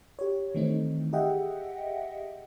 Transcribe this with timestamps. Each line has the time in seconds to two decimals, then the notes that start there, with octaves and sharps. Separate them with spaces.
0.19 G4 C#5
0.55 D#3 E3 A3 C4 D#4
1.13 G4 G#4 D#5 E5 F#5 G5